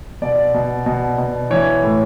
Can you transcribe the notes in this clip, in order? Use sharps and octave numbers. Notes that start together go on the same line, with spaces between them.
B2 D5
B2
B2
B2
E3 C#5
A2